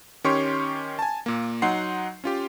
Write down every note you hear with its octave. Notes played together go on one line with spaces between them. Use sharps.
D#3 C#4 G4 C#5 C6 C#6
G#5 A5
A#2 A#3
F#3 D#4 F#5 C6 C7
C#4 F4 G4